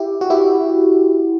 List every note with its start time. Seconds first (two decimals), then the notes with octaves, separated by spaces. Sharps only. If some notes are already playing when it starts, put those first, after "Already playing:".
Already playing: E4 G4
0.21 F#4
0.30 E4 G4